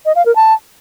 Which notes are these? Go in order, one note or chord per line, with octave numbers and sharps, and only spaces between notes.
D#5
F5
A#4
A5